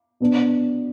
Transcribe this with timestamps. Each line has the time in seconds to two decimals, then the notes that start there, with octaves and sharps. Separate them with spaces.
0.20 B2 B3 D4